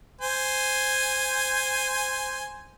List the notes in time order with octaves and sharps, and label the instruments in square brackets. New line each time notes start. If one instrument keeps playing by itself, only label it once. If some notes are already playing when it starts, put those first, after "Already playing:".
[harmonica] C5 G#5